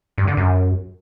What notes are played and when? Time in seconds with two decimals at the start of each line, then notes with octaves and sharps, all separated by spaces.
0.18 G2
0.27 D3
0.37 F#2